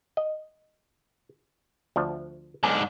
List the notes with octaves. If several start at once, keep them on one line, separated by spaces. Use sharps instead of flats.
D#5
D2 F3 D4
B1 G#2 D4 G#5